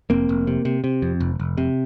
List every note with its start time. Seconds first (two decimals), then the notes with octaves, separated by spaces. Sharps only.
0.10 F1 A#3 C4
0.29 F1
0.47 C3
0.65 C3
0.84 C3
1.02 F2
1.20 F1
1.40 F1
1.58 C3